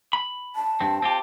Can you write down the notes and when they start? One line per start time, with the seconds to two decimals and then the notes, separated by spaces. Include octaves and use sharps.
0.13 B5
0.56 A5
0.80 G2 C4
1.02 C4 F4 G4